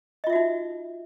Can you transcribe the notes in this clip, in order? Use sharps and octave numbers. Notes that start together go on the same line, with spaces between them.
D#4 F4 F#4 D#5 E5